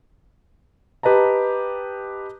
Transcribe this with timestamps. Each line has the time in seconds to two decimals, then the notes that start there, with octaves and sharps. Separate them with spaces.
1.03 G4 B4 D#5 A5 A#5